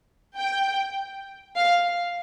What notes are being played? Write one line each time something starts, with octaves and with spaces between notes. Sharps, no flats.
G5
F5